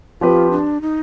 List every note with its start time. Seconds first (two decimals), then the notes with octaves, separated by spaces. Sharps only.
0.21 F3 C4 F4 G4 B4
0.51 D4
0.81 D#4